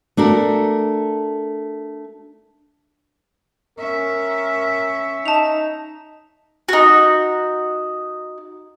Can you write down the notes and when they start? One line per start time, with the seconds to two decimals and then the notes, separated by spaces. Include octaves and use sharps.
0.17 A3 D4 F#4 A#4
3.78 C#4 A#4 E5
5.26 D#4 A5 F7
6.69 D#4 F#4